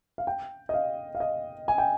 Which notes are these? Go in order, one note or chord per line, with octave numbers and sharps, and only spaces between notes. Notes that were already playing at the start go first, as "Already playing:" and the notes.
F5
G5
D#5
F5
F5
D#5
G#5
G5